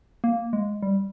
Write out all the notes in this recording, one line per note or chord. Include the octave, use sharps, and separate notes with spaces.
A#3
G#3
G3